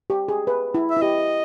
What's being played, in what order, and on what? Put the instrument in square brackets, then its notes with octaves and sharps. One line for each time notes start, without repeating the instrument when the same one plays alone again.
[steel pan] G4
G#4
B4
E4
[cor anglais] E5
[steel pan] E4
[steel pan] G4 [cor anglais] D#5